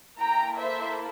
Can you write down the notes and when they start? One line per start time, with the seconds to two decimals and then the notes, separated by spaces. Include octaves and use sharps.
0.19 A#3 E4 A4 G5 A#5
0.57 C5 E5